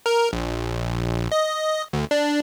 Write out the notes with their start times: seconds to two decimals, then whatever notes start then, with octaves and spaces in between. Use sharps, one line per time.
0.06 A#4
0.33 A#1
1.32 D#5
1.93 D2
2.11 D4